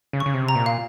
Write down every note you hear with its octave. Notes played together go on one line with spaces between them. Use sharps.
C#3
C#6
C#3
C3
A#5
A#2
F5